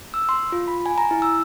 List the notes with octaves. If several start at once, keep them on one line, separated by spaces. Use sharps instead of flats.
E6
C6
F4
B5
G#5
A#5
E4
E6